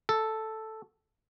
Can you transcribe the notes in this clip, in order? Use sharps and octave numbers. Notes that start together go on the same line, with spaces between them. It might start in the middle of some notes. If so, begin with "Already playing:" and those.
A4